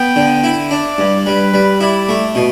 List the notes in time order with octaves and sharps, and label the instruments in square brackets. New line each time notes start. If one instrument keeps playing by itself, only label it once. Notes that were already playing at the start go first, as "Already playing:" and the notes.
Already playing: [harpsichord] B3 [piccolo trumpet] G5
[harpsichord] D3
E4
[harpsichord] D4 [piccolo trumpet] D5
[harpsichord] G2
[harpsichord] G3 [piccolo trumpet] B4
[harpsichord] G3
[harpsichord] E4 [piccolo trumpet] D5
[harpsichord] A3
B2